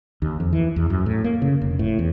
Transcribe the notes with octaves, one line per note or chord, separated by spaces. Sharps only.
D#2
F2
E3
E2
F#2
A2
A#3
C#3
F1
A2
E2